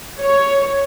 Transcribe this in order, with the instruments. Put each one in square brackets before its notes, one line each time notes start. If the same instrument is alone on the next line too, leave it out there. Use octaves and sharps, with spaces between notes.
[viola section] C#5